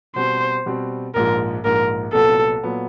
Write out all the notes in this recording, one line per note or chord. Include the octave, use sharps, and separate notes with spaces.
B2 G3 C4 C5
B2 G3 C4
A#1 G#2 F3 A#4
A#1 G#2 F3 A#4
C2 A#2 F#3 B3 A4
A#2 F#3 B3